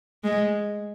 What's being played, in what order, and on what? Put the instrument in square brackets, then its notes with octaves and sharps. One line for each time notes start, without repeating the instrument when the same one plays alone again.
[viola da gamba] G#3